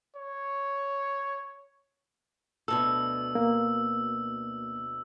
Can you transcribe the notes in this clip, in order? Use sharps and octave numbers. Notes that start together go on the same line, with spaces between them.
C#5
D2 B2 A4 E6
A#3